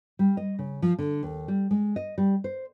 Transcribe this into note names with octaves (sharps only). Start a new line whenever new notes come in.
G3
D#5
C#3
F3
D3
D#2
G3
G#3
D#5
G3
C5